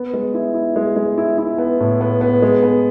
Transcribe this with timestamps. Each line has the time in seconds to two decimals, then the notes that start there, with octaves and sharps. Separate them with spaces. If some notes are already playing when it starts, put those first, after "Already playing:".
Already playing: B3
0.14 G#3
0.34 E4
0.54 E4
0.76 G#3
0.96 G#3
1.18 E4
1.38 E4
1.58 B3
1.80 A2
2.01 B3
2.21 B3
2.42 G#3
2.63 B3